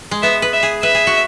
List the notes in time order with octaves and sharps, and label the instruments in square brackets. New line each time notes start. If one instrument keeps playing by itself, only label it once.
[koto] G#3
[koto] B3 [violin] E5
[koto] B4
[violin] E5
[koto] G#4
[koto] B4 [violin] E5
[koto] G#4
F#4